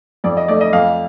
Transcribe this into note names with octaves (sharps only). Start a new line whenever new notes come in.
F2 D5
D#5
A3 D5
D#5
F2 F5